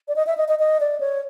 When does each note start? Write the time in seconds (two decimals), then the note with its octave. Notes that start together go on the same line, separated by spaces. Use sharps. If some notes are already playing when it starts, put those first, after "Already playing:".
0.08 D5
0.16 D#5
0.27 E5
0.37 D#5
0.48 D#5
0.59 D#5
0.80 D5
1.00 C#5